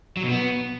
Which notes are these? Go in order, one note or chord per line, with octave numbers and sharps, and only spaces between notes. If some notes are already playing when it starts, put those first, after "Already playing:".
F#3
B2
B3